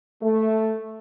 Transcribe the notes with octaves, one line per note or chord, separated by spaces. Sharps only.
A3